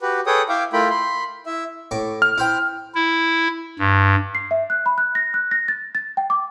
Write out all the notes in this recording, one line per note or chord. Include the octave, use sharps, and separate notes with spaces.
F#4 G4 B4
G#4 A4 B4 C#5 G5 D#6
E4 E5 F5 G5 D6
A3 E4 F4 A#4 G5 B5
B5 C6
E4 E5
A2 C#6 D6
F6
E4 C5 G5
E4
G2
C7
E5
F#6
B5
F#6
A#6
F#6
A#6
A6
A6
G5
D6